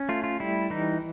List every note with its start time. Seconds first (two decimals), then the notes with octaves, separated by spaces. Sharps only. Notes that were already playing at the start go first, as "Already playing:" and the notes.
Already playing: C#4
0.09 A3 F4
0.24 F4
0.40 G3 E4
0.70 E3 D#4